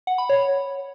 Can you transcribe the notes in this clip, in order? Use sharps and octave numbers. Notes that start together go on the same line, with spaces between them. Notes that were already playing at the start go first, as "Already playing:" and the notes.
F#5
B5
C#5